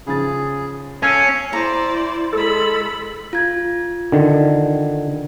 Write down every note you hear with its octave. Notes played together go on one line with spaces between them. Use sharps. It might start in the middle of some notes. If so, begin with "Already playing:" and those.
C#3 F3 G#4 A6
C#4 A4 F5 G#6 D#7
E4 C5 D5 A#5
G#3 A4 B5
F4 G#6
D3 D#3